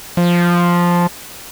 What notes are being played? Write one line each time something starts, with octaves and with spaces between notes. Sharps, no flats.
F3